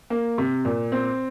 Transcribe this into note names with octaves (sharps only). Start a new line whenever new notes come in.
A#3
C3
A#2
C4